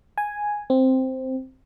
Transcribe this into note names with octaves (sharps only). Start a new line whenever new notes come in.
G#5
C4